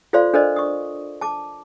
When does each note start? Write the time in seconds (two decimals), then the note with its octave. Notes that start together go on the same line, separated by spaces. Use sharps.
0.13 F4 A4 C5 D5 F5 C6
0.33 D4 A4 A#4 C5 D5 D#5
0.56 C#6 D#6
1.21 A5 D6